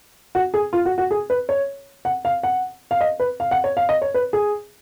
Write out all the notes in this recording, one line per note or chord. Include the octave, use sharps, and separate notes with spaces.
F#4
G#4
F4
F#4
F#4
G#4
B4
C#5
F#5
F5
F#5
F5
D#5
B4
F5
F#5
C#5
F5
D#5
C#5
B4
G#4